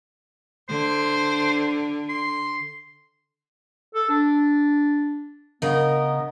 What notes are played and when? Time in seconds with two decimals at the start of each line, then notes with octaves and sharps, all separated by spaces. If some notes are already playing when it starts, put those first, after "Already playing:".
0.69 D3 C5
2.09 C6
3.95 A4
4.09 D4
5.62 C#3 B3 A#4 D#5